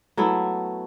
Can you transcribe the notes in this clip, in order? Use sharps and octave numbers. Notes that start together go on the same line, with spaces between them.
F#3 A3 B3 E4